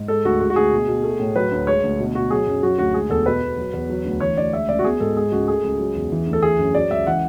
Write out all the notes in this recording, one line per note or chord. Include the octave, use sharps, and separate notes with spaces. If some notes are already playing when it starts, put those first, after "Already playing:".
Already playing: G#2
G#3 A4
D2 F#4
G#3 F#4
F#4
D2 G#4
B2
B2
A3
A2
F#3 B4
D2
G#3 C#5
D2
B2
B2 F#4
F#3 G#4
F#2
F#3 F#4
D2 F#4
G#3 G#4
E2 A4
B2 B4
B2
F#3
E2
F#3
D2
E3 C#5
D2 D5
G#3 E5
C#2 D5
F#4
B3 G#4
G#2 A4
G#3 G#4
C#2 F#4
A3 G#4
C#2
F#3
E2
E3
D2
A4
E3 G#4
F#2
F#3 D5
C#2 E5
E3 F#5